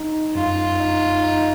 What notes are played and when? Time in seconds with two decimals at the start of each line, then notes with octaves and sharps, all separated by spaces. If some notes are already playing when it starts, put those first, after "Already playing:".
Already playing: D#4
0.35 F#2 F4
0.80 D#4
1.24 D#4